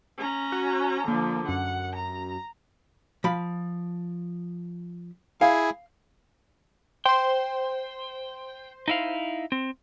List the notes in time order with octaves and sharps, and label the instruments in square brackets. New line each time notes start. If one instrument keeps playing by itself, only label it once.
[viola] C#4 A#5
[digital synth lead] F#4
[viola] D3 F3 [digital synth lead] A#3
[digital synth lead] F#2 [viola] F#5
[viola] A#5
[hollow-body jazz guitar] F3 B5
[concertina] E4 G#4 G#5 [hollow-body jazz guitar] F5
[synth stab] C5 C6 [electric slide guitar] G5
[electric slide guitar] D#4 E4 F5
C4